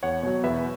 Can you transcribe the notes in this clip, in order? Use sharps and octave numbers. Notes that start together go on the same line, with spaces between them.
E2 C#5 F#5
B2 F#3 C#5
E2 B4 E5